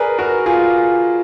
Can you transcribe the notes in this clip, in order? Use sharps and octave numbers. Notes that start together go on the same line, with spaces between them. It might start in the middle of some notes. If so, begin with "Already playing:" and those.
Already playing: G#4 A#4 B4 D5
F#4 A#4
F4 G#4